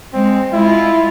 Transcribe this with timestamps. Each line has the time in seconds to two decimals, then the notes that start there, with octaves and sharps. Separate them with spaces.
0.14 G#3 C4
0.53 G#3 E4 F4